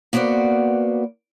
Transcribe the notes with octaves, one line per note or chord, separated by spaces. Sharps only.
A#3 B3 F#4 C5 D5